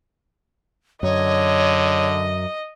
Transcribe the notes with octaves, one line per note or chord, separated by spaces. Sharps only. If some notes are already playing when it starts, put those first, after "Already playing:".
F#2 D3 C#5 D#5